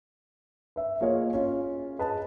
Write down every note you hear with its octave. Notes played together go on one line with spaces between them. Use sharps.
B4 E5
A#3 F4 G#4 C#5 D#5 F5
C#4 F4
G#4 B4 D#5 A5